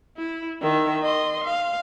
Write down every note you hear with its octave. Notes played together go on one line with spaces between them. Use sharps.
E4
D#3 E5
D#5 C6
F5